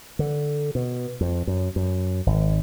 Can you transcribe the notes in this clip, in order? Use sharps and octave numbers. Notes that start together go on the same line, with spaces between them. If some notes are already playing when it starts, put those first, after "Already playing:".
D3
B2
F2
F#2
F#2
G#1